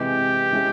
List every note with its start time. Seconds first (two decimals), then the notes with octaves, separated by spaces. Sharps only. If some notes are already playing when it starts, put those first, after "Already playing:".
Already playing: C3 E3 G#3 G4
0.53 E3 G#3 C#4